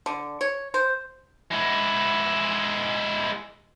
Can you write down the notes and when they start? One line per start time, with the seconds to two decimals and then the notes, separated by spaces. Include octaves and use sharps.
0.06 D3
0.41 C#5
0.74 C5
1.51 G#3 E4